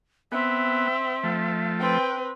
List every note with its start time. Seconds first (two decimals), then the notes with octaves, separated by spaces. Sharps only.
0.32 B3 C4 E5
1.24 F3 A3
1.79 C4 B4 G5